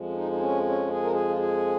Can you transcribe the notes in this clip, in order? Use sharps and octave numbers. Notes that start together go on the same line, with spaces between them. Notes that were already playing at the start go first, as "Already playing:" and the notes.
Already playing: F2 F3 G#3
C#4
D#4
D#4
C#4
C#4
G#4
A#4
G#4
F4
G#4